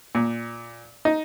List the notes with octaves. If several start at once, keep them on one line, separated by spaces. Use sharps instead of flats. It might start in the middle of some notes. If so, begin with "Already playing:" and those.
A#2
D#4